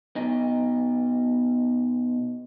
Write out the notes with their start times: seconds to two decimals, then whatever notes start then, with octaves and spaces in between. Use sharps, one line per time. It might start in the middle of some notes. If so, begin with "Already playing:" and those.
0.16 B2 D#4